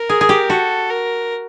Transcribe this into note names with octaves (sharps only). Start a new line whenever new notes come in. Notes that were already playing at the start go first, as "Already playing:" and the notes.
Already playing: A#4
G#4
G#4
G4
F#4 A4
A#4